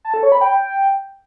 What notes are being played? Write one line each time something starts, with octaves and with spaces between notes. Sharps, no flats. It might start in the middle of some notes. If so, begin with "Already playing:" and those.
A5
A4
C#5
B5
G5